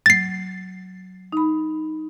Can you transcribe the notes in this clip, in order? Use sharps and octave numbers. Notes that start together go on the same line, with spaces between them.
F#3 A6 C7
D#4 B5